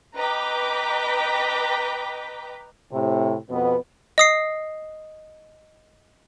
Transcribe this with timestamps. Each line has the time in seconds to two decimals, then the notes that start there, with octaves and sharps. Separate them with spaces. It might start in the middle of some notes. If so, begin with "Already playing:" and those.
0.17 B4 D#5 G5 A#5 D6 B6
2.91 A2 C3
3.49 F2 B2 B3
4.18 D#5 D#6 C7